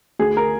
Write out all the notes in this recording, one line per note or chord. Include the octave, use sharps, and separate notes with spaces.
D2 G#4
A#4